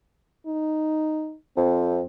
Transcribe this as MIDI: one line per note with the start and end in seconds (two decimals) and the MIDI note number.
0.46 1.35 63
1.57 2.02 41
1.57 2.06 60